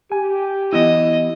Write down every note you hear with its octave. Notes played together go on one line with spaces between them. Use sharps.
G4 G#5
E3 B3 E4 D#5